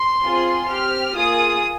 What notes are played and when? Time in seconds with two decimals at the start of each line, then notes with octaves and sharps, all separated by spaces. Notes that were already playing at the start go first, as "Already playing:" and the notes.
Already playing: C6
0.23 C4 F4 G#4
0.69 C4 G4 F6
1.15 A#3 F4 G#4 D#6